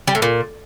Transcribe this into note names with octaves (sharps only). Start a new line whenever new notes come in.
G3
A2
A#2